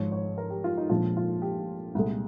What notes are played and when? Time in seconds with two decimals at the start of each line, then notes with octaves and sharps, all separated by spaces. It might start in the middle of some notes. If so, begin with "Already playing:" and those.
Already playing: G#1 G#2 F3 C#5
0.12 C#5
0.38 A#4
0.50 G4
0.64 F4
0.77 D#4
0.89 A#1 A#2 F3 G#3 F4
1.17 F4
1.42 G4
1.95 C2 A#2 G#3